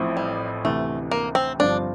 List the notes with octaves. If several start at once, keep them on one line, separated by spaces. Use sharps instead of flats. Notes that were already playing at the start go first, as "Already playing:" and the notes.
Already playing: A1 A2 F3 C4 E4
G3
D2 C3 E3 A3
A#3
C4
G1 G2 F3 C4 D4 F4